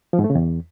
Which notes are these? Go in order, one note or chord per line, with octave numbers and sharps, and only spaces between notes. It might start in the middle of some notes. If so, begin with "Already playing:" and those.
F3
G#2
A3
C#3
E2